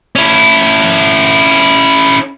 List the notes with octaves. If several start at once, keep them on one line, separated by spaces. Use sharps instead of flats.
C#4 E4